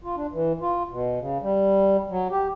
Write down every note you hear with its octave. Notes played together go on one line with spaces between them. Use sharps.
F4
D4
E3
F4
B2
C#3
G3
F#3
G4